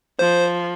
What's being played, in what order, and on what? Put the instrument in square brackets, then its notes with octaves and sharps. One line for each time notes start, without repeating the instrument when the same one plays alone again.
[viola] F3 [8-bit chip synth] C5